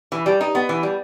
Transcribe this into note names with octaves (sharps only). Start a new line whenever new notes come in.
E3
G3
D#4
B3
E3
G3